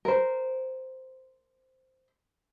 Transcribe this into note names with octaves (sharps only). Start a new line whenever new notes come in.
A#4 C5